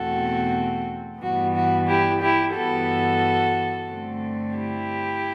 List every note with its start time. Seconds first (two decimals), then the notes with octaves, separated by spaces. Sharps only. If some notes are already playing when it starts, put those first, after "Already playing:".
Already playing: E2 B2 A3 C4 F#4 A4
1.20 G2 E3 G3 B3 F#4
1.54 F#4
1.87 E4 G4
2.21 E4 G4
2.54 G2 E3 B3 F#4 A4
3.88 G2 D3 A3 C4
4.56 E4 G4